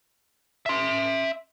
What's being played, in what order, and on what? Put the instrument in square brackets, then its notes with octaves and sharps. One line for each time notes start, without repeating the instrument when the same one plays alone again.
[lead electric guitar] E5 C6